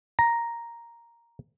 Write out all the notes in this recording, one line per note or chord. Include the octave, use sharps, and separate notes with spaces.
A#5